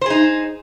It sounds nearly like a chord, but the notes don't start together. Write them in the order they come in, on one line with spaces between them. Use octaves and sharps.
C5 G#4 D#4